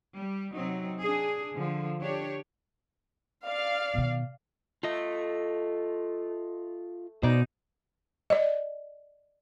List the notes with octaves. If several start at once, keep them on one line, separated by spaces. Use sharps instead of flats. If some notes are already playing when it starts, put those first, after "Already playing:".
G3
C3 F#3 C4 D#4
D4 G#4
D3 F3
D4 G4 C#5
D5 F5
B2 D#3
A3 F4 D#5
B2 D#4 C5 D5
D5 D#5